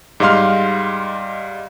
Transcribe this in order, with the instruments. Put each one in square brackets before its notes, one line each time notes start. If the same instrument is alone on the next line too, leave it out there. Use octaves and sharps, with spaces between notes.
[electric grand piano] G#2 G3 D#5 F5 C6 F6